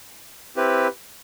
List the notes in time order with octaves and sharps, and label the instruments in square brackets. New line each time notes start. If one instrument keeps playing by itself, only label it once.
[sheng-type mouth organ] C4 E4 G4 B4